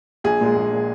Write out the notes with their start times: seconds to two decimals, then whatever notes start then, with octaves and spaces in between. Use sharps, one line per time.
0.24 A#1 G#4
0.41 A#2 G#3
0.56 A#1
0.72 A#2 G#3